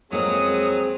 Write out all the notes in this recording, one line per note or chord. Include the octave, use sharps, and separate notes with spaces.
F2 F#3 G#3 A#3 C4 G#4 D#6